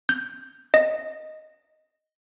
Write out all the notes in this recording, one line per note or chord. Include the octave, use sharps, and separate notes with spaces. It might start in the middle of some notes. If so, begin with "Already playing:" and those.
G6
D#5